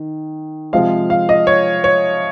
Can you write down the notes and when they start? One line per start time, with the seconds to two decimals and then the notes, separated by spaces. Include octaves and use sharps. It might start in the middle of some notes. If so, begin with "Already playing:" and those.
Already playing: D#3
0.73 C3 F3 G#3 C4 F5
1.10 F5
1.29 D#5
1.47 C#5
1.84 C#5